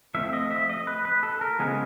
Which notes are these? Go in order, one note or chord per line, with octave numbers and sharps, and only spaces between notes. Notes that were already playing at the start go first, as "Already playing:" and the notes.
F3 A3 C4 E5
D#5
E5
D#5
B4
B4
A4
A#4
C#3 F3 G#3 B3 G#4